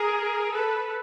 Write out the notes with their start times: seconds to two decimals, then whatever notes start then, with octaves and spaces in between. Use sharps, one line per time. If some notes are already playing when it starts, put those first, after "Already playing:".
Already playing: G#4 A#4
0.52 A4 B4